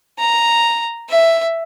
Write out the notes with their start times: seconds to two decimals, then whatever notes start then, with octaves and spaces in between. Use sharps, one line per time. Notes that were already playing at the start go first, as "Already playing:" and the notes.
0.19 A#5
1.10 E5